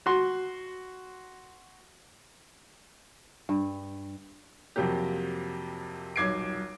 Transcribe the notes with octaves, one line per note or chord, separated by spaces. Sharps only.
F#4 C6
G2
F2 C3 F#3 A#3 G4
D#1 B1 D6 G#6 C7 D7